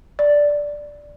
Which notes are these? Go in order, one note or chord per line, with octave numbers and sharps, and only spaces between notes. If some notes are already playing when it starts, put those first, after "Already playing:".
D5